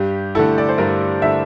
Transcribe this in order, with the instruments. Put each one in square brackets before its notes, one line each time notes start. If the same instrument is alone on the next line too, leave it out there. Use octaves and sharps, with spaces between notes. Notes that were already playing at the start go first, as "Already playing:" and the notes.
Already playing: [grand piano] G2 [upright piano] G4
[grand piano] D3 A3 E4 [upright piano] A4
[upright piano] D5
C5
[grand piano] G2 [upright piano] A#4
[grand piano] D3 A3 E4 [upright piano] E5